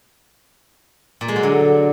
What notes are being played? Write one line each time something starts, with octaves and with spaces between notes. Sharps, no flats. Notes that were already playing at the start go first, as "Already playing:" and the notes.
A#2
G#3
F#3
D3